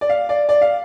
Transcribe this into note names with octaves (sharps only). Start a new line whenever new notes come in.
D5
F5
D5
D5
F5